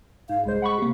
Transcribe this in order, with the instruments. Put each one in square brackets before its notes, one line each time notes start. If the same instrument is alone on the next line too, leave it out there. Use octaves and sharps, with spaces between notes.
[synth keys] G#2 [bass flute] F5
[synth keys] C2 C5 [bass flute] G#3
[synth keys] F#5 B5 C#6
C3 A#3